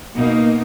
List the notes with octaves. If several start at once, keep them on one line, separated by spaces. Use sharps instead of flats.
B2 A#3 D#4